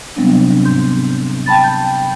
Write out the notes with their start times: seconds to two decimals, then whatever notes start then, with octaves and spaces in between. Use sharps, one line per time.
0.16 C3 F#3 G3 B3 C4 D4
0.65 G#2 G6
1.46 G5 A5 B5 A6
1.64 G6